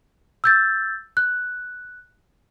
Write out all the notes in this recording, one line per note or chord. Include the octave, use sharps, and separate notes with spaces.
E6 G6 A6
F#6